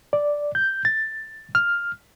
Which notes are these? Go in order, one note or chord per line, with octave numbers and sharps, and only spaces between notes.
D5
G6
A6
F6